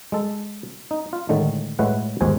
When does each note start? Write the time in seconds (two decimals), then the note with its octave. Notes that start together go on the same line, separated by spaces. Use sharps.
0.12 G#3 A4
0.91 D#4
1.13 F4
1.29 A2 D3 D#3 G#3 A3
1.79 A2 G#3 E4 B4 C#5 F#5
2.21 G1 D#2 G#2 F3 C5 G#5